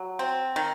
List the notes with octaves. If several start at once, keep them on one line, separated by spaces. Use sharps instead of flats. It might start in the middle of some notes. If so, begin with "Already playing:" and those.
Already playing: F#3
C4
D#3